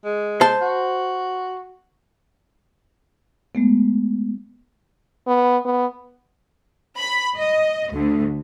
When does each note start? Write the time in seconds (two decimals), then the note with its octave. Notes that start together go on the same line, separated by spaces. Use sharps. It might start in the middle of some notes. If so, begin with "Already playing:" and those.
0.04 G#3
0.41 C5 A5
0.61 F#4
3.55 G#3 A3 B3
5.27 B3
5.65 B3
6.98 B5
7.38 D#5
7.93 D2